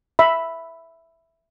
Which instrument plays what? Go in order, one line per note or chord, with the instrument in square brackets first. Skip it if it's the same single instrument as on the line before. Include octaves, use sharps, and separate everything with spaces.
[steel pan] E5 B5